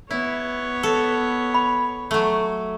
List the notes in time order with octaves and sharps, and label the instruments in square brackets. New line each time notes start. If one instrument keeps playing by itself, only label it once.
[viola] B3 C#5 [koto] E4
[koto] A4
[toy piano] B5
[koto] F#3 A3